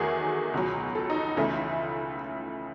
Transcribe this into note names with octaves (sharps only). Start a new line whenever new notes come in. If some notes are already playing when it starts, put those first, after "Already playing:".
Already playing: E2 D#3 F#3 A3 F#4 G#4
C#2 B2 F#3
A4
D#4
C#2 C#3 E3 A3